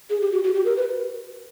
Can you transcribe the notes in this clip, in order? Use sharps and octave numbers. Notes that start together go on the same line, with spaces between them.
G#4
G4
F#4
F#4
G4
A#4
B4